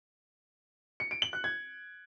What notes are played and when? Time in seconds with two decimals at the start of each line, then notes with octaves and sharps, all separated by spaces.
1.00 C#7
1.11 D7
1.22 F#7
1.33 F#6
1.44 G#6